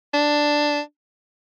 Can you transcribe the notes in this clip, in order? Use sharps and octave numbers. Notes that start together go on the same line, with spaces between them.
D4